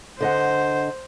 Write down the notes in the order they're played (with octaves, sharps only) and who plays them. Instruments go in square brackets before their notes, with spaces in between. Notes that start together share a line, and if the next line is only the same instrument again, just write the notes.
[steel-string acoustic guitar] D3 D#5 F#5 [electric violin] C5